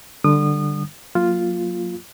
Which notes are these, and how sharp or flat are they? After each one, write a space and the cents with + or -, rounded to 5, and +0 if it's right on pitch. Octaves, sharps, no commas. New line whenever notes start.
D3 +10 G3 +0 D#6 -30
F#3 -25 A#3 +0 F4 +0